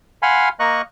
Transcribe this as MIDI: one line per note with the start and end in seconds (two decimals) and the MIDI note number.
0.22 0.49 77
0.22 0.49 78
0.22 0.49 80
0.22 0.49 83
0.22 0.49 84
0.22 0.49 89
0.60 0.82 58
0.60 0.82 70
0.60 0.82 75
0.60 0.82 85
0.60 0.82 90